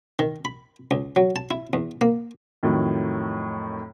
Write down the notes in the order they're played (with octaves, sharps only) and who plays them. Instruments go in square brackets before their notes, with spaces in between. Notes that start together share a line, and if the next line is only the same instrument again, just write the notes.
[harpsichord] D#3
B5
C#2
F#3
A5
E4
E2
A#3
[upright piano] F2 A2 D#3 F#3